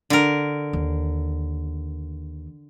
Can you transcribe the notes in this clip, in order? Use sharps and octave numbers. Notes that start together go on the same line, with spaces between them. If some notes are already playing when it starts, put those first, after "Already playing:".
D3 A#4
D#2